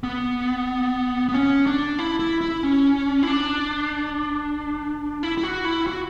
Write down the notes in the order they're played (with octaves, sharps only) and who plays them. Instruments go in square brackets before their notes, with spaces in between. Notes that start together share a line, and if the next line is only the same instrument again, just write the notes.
[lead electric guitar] B3
B3
C#4
D4
E4
E4
E4
C#4
E4
D4
E4
E4
F#4
E4
F#4